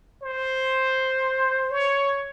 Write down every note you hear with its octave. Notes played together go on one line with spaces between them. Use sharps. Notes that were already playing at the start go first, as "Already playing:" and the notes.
C5
C#5